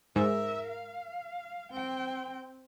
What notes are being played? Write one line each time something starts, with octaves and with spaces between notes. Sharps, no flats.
G#2 A#4 E5
F5
C4 G5